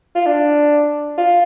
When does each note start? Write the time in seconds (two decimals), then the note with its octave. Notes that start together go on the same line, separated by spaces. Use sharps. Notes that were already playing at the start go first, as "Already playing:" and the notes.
0.15 F4
0.26 D4
1.18 F4